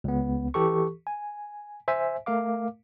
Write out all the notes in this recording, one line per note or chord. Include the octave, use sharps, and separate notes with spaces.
C#2 B3
E3 G4 A4 C#6
G#5
C5 E5 G#5
A3 A#4 F5 D6